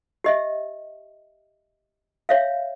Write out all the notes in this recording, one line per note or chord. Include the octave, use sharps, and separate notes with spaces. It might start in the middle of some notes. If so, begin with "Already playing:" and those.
G4 D#5 E5
C#5 E5 F5